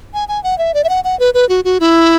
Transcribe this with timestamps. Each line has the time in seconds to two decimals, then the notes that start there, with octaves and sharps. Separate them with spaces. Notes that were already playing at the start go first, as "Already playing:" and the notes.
0.14 G#5
0.28 G#5
0.44 F#5
0.58 E5
0.74 D5
0.84 E5
0.89 F#5
1.04 F#5
1.19 B4
1.34 B4
1.49 F#4
1.65 F#4
1.80 E4